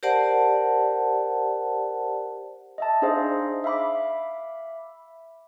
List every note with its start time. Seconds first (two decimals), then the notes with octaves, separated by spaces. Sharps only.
0.03 G4 A#4 C5 D5 F#5 A5
2.78 D#5 E5 A5
3.02 D4 D#4 G#4 C5 D#5 F5
3.64 E5 F5 B5 D6